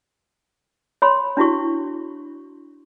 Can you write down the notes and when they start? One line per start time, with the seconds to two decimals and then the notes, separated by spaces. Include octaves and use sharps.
1.02 C#5 B5 C6
1.37 D4 E4 F#4 C#6